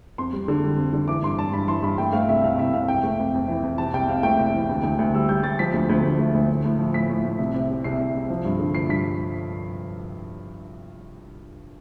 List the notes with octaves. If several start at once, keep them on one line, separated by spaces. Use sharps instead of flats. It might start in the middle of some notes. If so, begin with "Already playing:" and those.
F2 C6
G3
D3
G3
F2
D3
E3 D6
G2 C6
G2 A5
G2 B5
E3 C6
G2 B5
A3 G5
A3 F5
C2 E5
C2 F5
C2 E5
C2 F5
F2 G5
A3
F2
F2
E3
F2
C3 A5
C2 G5
C3 F5
A3 G5
C2
E3
D2
D2
D2
G3 E6
G3 G6
G3 A6
F3 B6
D2
D2
D2
A3
D2
A2
A2
F3
A2 B6
A2
A2
C2
C3
C2
C2 C7
C2
C2
F3
G2
D3
F3 C7
G2 B6